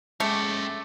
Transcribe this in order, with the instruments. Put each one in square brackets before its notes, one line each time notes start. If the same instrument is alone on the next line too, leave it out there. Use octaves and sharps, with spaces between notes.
[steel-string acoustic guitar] G#3 [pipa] A3 [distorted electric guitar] C#4 G5 [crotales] D6 C#7